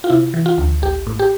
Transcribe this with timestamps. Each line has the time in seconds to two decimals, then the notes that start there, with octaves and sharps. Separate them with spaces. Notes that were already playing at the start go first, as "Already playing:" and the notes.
0.04 F4
0.10 C3 E4
0.34 E3
0.46 F4
0.58 D2
0.82 A1 G4
1.07 A2
1.19 G4